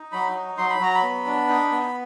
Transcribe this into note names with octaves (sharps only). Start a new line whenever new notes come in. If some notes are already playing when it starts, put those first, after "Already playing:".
Already playing: D#4
F#3 B5
D#4
F#3 C6
B5
F#3 A#5
B5
B3
D4
D#4
B3